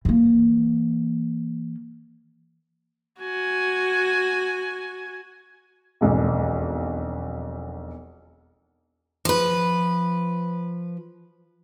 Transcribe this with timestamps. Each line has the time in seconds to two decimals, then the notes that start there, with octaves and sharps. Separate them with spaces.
0.05 E3 A#3
3.21 F#4 G#5
6.01 E1 B1 F2
9.25 F3 B4